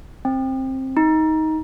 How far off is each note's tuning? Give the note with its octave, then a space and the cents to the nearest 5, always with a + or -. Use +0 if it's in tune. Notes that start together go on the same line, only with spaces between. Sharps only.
C4 +15
D#4 +15